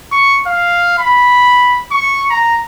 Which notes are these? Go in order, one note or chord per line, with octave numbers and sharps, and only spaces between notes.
C#6
F5
B5
C#6
A#5